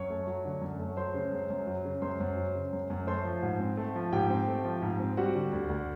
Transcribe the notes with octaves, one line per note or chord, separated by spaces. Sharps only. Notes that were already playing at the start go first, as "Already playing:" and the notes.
Already playing: F#2 C#5 C#6
A3
F#3
D3
F#2
A3
F#3 C5 C6
C#3
F#2
F#2
F#3
C#3
F#2 C5 C6
F#2
F#3
C#3
F#2
F#2
A3 C5 C6
F3
G#2
C4
A3
F3
G#2 G4 G5
C4
A3
F3
G#2
C4
G3 F#4 F#5
D3
D2
D2